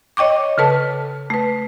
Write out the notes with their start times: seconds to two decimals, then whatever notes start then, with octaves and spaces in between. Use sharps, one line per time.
0.17 C#5 D#5 G5 C#6 D6
0.58 C#3 A4 B4 A5
1.30 A3 B4